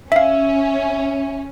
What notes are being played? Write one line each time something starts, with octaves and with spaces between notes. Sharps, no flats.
C#4 E4 E5 F5